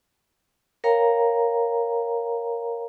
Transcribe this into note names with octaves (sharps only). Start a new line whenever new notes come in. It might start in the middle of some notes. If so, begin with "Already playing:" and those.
A#4 C#5 F5 G5 A#5